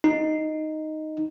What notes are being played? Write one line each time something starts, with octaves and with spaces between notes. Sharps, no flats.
D#4